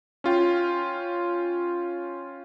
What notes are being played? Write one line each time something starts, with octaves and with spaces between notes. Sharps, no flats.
C#4 F4 G5